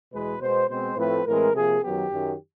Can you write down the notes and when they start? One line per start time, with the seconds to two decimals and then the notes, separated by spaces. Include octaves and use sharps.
0.12 E2 B2 G#3 B4
0.41 B2 G#3 B3 C5
0.69 B2 G#3 C4 C5
0.97 A2 F3 A3 C4 B4
1.25 A2 E3 G#3 C4 A#4
1.54 C3 F3 A#3 G#4
1.82 F#2 D#3 F#3 B3 G4
2.11 F#2 D#3 F#3